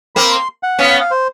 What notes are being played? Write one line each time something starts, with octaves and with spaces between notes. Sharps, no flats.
A#3 C4 B5
C6
F#5
B3 C#4 F5
F5
F5
C5